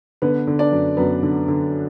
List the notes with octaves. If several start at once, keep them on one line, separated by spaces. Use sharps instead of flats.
D3 B3 B4
D3
D4 D5
F#2
F#2 B3 B4
D3
D3